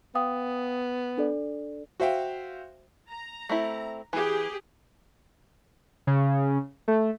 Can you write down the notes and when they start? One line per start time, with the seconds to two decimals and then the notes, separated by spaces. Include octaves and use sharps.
0.15 B3 F5 G5 D#6
1.18 D4 A4 D5
2.00 F#4 C5 E5 F5 G5
3.09 A#5
3.49 A3 C4 E4
4.13 E3 G4 G#4
6.07 C#3
6.88 A3